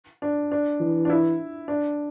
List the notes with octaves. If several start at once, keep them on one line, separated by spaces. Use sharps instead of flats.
D4
D4
E3
D4
E4
D4